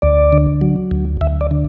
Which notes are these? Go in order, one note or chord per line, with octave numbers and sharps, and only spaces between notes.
D2 D5
D3
F#3
D2
D2 E5
D5
D3